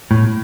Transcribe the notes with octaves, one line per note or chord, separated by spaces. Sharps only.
A2